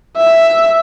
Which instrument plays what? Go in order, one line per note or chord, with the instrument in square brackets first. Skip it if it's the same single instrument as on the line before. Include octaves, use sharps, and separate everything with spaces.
[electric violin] E5